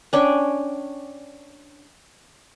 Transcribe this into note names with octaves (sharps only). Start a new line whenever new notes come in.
C#4 D4 G5 G#5